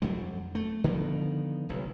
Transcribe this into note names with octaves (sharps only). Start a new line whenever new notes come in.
F2 F#3 G3
A3
D3 D#3 F3 B3
F1 B1